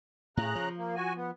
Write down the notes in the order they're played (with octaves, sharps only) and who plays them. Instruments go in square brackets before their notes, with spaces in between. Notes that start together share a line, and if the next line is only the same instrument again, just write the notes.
[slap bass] A2 [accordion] C#3 A#5 F#6
[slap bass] F3
[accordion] A#3
F#4 G#5
B3